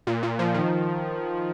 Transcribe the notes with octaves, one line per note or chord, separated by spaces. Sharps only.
A#2
A#2
F3
D#3